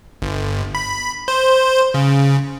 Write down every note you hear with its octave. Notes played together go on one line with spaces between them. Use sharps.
G1
B5
C5
C#3